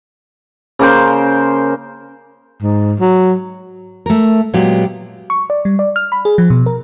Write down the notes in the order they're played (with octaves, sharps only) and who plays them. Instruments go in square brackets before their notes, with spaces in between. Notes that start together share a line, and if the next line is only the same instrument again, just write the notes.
[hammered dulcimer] C#3 A#3 A#4 C5
[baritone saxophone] G#2
F#3
[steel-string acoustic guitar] A3 A#4
A#2 F#3 G#3 B3 G4
[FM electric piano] C#6
D5
G3
D5
F6
B5
G#4
F3
B2
A#4